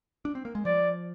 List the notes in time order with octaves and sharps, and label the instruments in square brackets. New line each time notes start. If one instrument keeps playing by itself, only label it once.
[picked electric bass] D4
C4
A#3
G#3
[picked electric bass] F3 [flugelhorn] D5